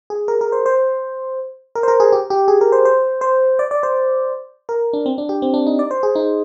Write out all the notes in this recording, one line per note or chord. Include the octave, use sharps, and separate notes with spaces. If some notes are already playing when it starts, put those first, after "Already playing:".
G#4
A#4
A#4
C5
C5
A#4
C5
A#4
G#4
G4
G4
G#4
A#4
C5
C5
C5
D5
D5
C5
A#4
D4
C4
D4
G4
C4
D4
D#4
D5
C5
G#4
D#4